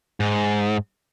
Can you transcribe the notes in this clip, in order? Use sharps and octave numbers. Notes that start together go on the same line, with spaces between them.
G#2